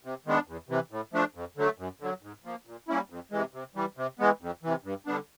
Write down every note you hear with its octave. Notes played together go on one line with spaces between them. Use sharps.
C3
D#3 G#3 B3 D4
E2
C3 E3
A2
F3 A3 D4
F2
D3 F#3 A3
F#2
D3 F#3
G#2
F3 A#3
A#2
G3 A#3 C#4 E4
F2
C3 E3 G#3
C3
E3 G3
C3
E3 G#3 B3
F2
C3 E3
G2
D3 G3 B3 D4